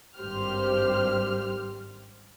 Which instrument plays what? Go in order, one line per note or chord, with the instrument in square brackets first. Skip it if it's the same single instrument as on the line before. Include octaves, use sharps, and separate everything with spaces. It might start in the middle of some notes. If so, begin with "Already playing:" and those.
[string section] G#1 G2 G4 C5 F6